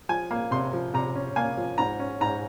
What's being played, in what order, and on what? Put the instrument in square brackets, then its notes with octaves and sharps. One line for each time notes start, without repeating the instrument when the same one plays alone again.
[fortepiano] F3 G#5
A#3
C3 C6
F3
C3 A#5
C#4
A#3 G#5
F3
G#2 A#5
C#4
G#2 A#5